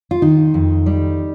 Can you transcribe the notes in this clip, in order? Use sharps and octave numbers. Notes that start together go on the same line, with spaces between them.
F4
D#3 D#4
F2
G3